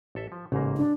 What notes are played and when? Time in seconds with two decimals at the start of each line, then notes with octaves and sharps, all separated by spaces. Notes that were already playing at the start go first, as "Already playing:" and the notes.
0.15 A1 A4 E5
0.32 F3
0.52 A1 G#2 C#3 A#3
0.77 D4